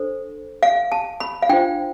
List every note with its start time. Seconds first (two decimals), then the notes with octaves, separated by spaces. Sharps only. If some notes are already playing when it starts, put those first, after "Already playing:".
Already playing: D4 A4 C5
0.63 F5
0.92 A5
1.20 B5
1.42 F5
1.49 D4 F4 C5 G5